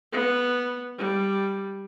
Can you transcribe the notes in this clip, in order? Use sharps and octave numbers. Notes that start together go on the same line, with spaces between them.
B3
G3